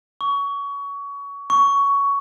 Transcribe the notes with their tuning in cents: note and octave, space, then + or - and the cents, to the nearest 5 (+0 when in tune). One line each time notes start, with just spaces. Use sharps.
C#6 +25
C#6 +15